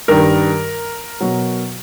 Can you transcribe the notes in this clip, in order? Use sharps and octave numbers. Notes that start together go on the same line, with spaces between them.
G2 D#3 G3 A#4
B2 F#3